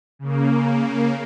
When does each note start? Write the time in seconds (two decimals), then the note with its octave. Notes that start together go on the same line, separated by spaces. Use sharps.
0.19 C#3 A#3